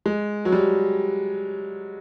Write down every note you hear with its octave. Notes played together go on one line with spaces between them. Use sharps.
G#3
F#3
G3